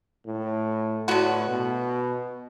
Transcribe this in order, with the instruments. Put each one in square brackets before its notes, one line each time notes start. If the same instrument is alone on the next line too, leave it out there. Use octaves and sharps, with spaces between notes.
[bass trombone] A2
[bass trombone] A2 [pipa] D3 F#3 B3 F#4
[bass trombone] B2